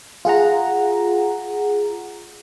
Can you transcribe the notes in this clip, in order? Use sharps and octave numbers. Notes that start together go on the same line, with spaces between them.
F4 G#4 F#5 A#5